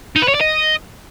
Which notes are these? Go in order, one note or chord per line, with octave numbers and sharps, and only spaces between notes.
D#4
B4
C#5
D5
D#5